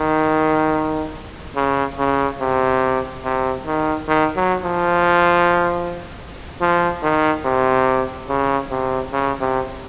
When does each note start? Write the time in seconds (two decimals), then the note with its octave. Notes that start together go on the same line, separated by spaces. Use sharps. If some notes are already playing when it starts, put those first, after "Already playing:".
Already playing: D#3
1.56 C#3
1.99 C#3
2.41 C3
3.24 C3
3.66 D#3
4.08 D#3
4.36 F#3
4.64 F3
6.61 F3
7.03 D#3
7.45 C3
8.28 C#3
8.70 C3
9.13 C#3
9.40 C3